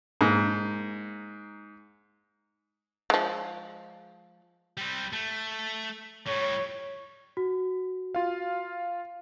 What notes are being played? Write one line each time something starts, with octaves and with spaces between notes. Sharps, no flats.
G#2 A#3
F3 G#3
G3 C4
A3
A2 G3 C#5
F#4
F4 F5